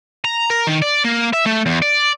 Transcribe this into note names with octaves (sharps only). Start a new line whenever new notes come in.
A#5
A#4
D#3
D5
A#3
E5
A3
E2
D5